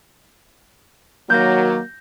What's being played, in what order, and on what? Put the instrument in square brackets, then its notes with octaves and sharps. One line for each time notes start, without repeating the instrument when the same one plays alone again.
[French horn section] D#3 F#3 [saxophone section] A#3 [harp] G6 A#6